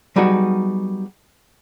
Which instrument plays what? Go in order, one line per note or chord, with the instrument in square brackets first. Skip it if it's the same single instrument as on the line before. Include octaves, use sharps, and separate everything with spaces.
[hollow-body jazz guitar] F#3 G3 B3 D#4 F#4 G#4